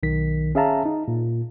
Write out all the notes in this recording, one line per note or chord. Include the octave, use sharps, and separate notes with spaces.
B1 D#3 B6
C#4 G#4 E5 F5 A5 A#5
D#4
A#2